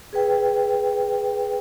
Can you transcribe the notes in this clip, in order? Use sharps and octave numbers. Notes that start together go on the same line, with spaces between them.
G#4 B4 G5